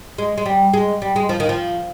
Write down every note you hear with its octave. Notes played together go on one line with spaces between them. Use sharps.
G#3
G#3
G3
G#3
G3
G#3
F3
D#3
F3